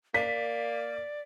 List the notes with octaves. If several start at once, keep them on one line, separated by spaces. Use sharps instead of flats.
A#3 D5 B6